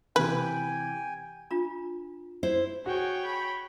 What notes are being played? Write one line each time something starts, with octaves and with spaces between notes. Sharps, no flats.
C3 E3 B4 G5 G#5
D4 F4 A#5
E4 C5
F#4 G#4 C#5 G5
B5